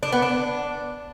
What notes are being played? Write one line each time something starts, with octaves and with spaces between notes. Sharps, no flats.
D4
B3
D4